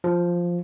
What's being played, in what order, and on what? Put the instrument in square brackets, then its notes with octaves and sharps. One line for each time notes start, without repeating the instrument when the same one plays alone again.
[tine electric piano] F3